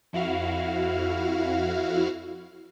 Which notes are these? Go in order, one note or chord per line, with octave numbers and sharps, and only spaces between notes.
F2 E4 F#4 F5 F6